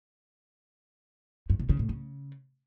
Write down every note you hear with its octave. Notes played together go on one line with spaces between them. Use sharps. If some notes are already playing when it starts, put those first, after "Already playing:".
G2
B2
C#3
A2
C#3